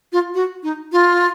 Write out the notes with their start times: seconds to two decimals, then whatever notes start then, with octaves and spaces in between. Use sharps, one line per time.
0.13 F4
0.34 F#4
0.63 D#4
0.92 F4